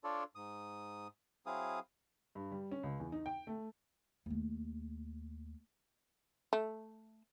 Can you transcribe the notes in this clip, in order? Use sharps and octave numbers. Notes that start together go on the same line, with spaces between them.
D4 F4 A4 C#5 D5
G#2 D#6
F#3 C4 E4 G#4 F5 D#6
G2
G3
C#4
C#2
E2
D#4
G5
A3
D#2 A3
A3